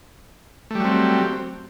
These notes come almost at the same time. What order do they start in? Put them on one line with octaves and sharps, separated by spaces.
A3 G3 F#3 C4